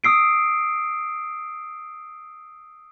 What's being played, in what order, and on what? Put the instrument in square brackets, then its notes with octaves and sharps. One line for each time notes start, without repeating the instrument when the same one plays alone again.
[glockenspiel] D#6 E6 C7 D7